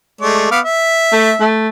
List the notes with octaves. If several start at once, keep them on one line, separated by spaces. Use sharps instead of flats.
G#3 A3 D5
B3 F5 D6
E5
A3
A3